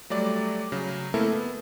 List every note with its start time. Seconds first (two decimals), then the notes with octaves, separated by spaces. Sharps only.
0.10 F#3 G3 A3 D5
0.72 C#3 F#3
1.14 A3 A#3 C4 E4 A4 A#4
1.32 B3